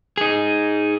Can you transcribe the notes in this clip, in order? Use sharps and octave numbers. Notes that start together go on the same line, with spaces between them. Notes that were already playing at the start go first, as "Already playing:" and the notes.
D#4 G#4